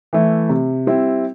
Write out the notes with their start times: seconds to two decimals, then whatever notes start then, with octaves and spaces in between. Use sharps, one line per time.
0.13 E3 A3 E4
0.49 C3
0.87 G3 C4 E4